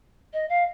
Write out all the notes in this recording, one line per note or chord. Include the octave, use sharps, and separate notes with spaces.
D#5
F5